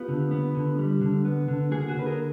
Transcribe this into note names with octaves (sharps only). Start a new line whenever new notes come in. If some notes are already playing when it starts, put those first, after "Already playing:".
Already playing: B3 F4 G4
D3
B3
D3
G3
D3
B3
D3
A#3 F#4 G#4
F#4 G#4
D3 B4
G#4 A#4